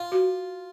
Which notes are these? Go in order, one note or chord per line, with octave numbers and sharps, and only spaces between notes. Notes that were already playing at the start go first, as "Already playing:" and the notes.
Already playing: F4
F#4